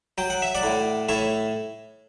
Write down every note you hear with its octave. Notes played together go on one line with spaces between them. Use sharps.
F#3 G5
F#5
E5
D5 F#5
A2
A2 C#5 E5